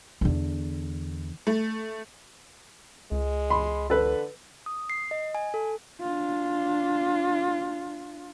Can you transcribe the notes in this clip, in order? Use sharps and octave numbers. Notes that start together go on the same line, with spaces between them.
E2 D3
A3
C#2 G#3
B5 C6
D3 A4 B4
D#6
C7
D#5
G#5
A4
D4 F4